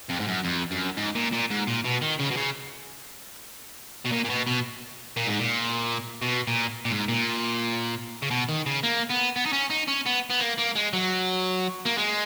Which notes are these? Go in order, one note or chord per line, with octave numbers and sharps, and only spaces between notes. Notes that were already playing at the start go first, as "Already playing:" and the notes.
F2
G#2
F#2
F2
F#2
G#2
A#2
A#2
G#2
A#2
B2
D#3
C#3
B2
C#3
B2
A#2
A#2
B2
B2
A#2
G#2
A#2
B2
A#2
A#2
G#2
A#2
C#3
B2
D#3
C#3
A#3
B3
B3
D#4
C#4
D#4
C#4
B3
B3
A#3
A#3
G#3
F#3
A#3
G#3